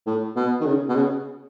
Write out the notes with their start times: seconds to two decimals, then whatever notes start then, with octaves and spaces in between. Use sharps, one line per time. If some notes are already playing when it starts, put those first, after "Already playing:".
0.06 A2
0.36 B2
0.60 D#3
0.65 C#3
0.89 B2
0.95 C#3